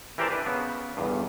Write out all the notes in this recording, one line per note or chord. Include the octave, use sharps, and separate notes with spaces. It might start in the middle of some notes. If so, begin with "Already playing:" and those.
E3 G4 A#4 C5 D5 A5
D4 B4
C#3 B3
G1 E2 G2